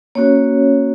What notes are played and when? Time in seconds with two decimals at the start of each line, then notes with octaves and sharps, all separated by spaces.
0.15 A#3 C#4 F#4 C#5